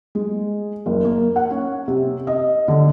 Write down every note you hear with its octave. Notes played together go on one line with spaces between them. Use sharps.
G#3
F#1
A#3
F#5
C#4
C3
D#5
D3